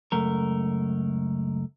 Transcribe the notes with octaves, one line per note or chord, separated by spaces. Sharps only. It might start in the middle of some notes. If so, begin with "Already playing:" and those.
C#2 F#2 A3 A#4